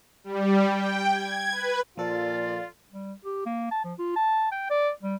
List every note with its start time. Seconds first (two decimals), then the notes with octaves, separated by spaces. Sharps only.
0.24 G3
0.70 G5
1.11 G#6
1.52 B4
1.98 A#2 F3 F4 A4 D5
2.92 G3
3.25 G4
3.46 A#3
3.71 A5
3.84 F3
3.99 F4
4.16 A5
4.52 G5
4.70 D5
5.03 G3